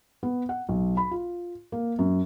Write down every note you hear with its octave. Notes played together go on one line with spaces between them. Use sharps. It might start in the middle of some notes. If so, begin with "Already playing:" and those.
B3
F#5
B1
B5
F4
A#3
F#2